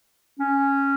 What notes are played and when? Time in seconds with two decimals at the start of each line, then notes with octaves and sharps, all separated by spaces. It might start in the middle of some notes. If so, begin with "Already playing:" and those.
0.40 C#4